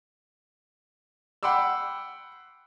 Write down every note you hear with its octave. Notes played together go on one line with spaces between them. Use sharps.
F#5 G5 B5 C6 D6 E6